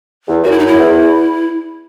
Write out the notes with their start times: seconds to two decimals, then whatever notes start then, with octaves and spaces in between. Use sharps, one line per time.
0.28 E2
0.44 F#2 F#4
0.51 E4
0.59 D#4
0.67 E4
0.78 E2